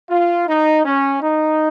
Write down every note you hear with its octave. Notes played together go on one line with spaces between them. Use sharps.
F4
D#4
C#4
D#4